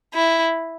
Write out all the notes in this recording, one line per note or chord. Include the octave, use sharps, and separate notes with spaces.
E4